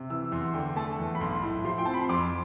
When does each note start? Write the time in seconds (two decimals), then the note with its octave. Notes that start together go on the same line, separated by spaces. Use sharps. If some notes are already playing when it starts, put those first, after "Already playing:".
Already playing: C3
0.10 E3 E6
0.32 E2 C6
0.54 D3 G5
0.76 A3 A5
0.99 E2
1.15 B5
1.20 B1 C6
1.43 A2
1.65 F3 C6
1.78 G5
1.85 C4 A5
1.94 B5
2.01 C6
2.09 F2 D6